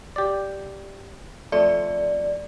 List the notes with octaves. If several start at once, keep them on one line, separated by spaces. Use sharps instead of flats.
G4 D5
F2 A3 D5